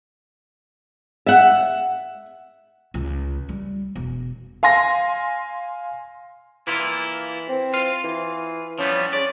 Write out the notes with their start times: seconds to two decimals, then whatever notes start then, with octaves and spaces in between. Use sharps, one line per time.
1.26 E5 F#5
2.94 C#2
3.49 G3
3.95 E1
4.63 F5 G#5 C6 A#6
6.67 E3 A#3 E4 F4
7.49 C4
7.74 F4 F5
8.04 E3
8.79 F3 G3 B3 C#4
9.13 C#4 D5